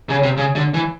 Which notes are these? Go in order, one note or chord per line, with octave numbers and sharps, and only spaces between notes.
C#3
C3
C#3
D3
E3